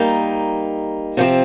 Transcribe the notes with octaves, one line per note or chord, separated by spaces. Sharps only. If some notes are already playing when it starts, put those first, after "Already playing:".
Already playing: G3 A#3 D#4
C3 F3 C4